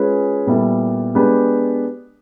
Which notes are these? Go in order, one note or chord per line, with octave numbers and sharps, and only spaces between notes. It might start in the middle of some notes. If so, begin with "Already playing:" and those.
Already playing: G#3 C#4 F4 G#4 B4
A#2 G3 B3 E4 A4
G#3 B3 D4 G4 B4